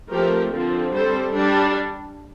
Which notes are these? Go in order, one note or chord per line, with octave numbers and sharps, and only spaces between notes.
F3 A3 C4 G4 A#4
D3 F3 C4
G3 C4 A4 C5
G3 D4